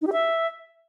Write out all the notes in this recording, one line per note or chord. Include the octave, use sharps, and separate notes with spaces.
D#4
G4
E5